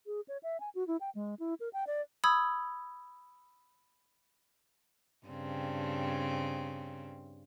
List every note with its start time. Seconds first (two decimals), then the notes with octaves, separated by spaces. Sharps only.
0.06 G#4
0.28 C#5
0.43 E5
0.60 G#5
0.75 F#4
0.88 E4
1.01 G5
1.15 G#3
1.39 E4
1.60 A#4
1.73 G5
1.87 D5
2.24 B5 D#6 E6 G#6
5.27 G2 C#3 C4